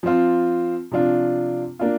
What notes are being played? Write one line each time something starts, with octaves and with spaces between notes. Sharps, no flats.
F3 C4 F4
C3 F3 D4 F4
A#3 D4 F4